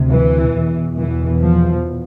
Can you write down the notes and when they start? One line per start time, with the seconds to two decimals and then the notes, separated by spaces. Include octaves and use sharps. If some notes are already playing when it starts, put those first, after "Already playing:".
Already playing: D2 C3
0.11 E3
0.55 E2 B2
0.98 E3
1.41 F3